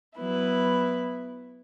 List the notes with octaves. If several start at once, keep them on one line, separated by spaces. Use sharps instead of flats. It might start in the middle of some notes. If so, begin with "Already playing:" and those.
F#3 B3 E4 B4